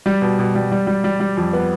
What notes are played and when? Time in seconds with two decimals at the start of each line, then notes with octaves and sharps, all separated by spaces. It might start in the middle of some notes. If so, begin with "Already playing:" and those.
0.06 G3
0.22 B2
0.39 B2
0.55 G3
0.72 G3
0.87 G3
1.04 G3
1.20 G3
1.37 F2
1.53 B3